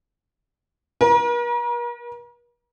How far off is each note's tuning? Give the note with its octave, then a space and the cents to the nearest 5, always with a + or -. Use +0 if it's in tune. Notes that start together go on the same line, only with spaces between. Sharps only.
A#4 +45